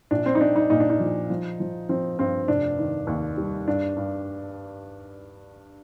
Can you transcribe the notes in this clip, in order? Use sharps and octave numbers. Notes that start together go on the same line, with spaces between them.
A#1 D4
C4
D#4
C4 D4
D#4
A#2 D#4
D4
D#4
F3
F3
F3
F3 C4
G2 C4
F1 D4
D#3
D#2
G3
G2 D4
G2